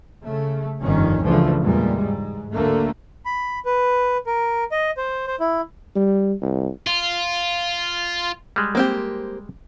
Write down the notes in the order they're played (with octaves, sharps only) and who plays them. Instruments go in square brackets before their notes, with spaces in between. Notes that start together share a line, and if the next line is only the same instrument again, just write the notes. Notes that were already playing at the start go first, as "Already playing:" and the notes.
[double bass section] C#3 A3
G1 C2 F2 D#3 C#4
C#2 D3 E3 F3 A3
E2 A#2 G3 G#3
G#2
D2 D3 A3 A#3
[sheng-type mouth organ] B5
B4
A#4
D#5
C5
C5
E4
[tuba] G3
C2
[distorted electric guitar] F4
[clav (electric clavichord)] G3 G#3
[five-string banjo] A#3 C4 G4